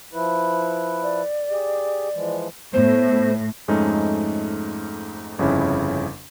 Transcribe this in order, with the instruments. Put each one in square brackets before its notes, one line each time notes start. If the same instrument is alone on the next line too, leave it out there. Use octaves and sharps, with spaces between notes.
[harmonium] F3 E4 B4
[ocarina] D5
[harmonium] G4 G#4
E3 F3 G#3
[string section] A2 [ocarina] B3 [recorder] C5
[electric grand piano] F2 G#2 G#3 A3 C#4 D#4
G1 F2 C#3 C#4 E4